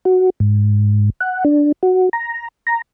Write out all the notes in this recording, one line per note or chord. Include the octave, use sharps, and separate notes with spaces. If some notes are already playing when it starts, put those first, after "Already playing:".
F#4
G#2
F#5
D4
F#4
A#5
A#5